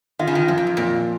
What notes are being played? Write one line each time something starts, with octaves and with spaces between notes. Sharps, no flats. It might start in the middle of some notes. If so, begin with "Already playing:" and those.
D#3 F4
C#3
D#3
F#2 F3
F2
F#2
F2 A#2